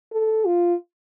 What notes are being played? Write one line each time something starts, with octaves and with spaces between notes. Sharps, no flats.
A4
F4